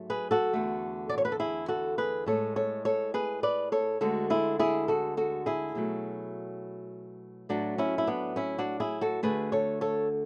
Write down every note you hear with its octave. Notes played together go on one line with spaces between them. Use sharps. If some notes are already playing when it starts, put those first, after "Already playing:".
Already playing: G#2 F#3 A3
G#4 B4
F#4 A4
E2 D3 A3
D5
C#5
B4
A4
E4 G#4
F#4 A4
G#4 B4
A2 G#3 A4 C#5
A4 C#5
A4 C#5
G#4 B4
B4 D5
A4 C#5
D2 D3 G#3 F#4 A4
E4 G#4
E4 G#4
F#4 A4
F#4 A4
E4 G#4
B2 F#3 A3
A2 F#3 A3 D4 F#4
C#4 E4
E4
B3 D4
C#4 E4
D4 F#4
E4 G#4
F#4 A4
D2 D3 A3 G#4 B4
A4 C#5
A4 C#5